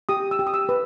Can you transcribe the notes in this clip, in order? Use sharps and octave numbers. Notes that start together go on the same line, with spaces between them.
G4 D#6
E6
G4
D#6
E6
B4